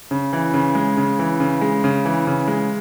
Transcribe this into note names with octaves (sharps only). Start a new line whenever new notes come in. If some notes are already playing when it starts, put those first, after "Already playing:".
C#3
E3
C#3
G#3
C#3
E3
C#3
G#3
C#3
E3
C#3
G#3